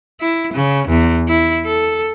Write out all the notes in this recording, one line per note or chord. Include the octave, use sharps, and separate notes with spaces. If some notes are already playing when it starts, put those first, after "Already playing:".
E4
C#3
E2
E4
A4